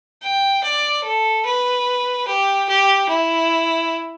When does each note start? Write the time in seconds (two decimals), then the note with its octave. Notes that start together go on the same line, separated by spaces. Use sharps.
0.22 G5
0.63 D5
1.03 A4
1.45 B4
2.27 G4
2.68 G4
3.08 E4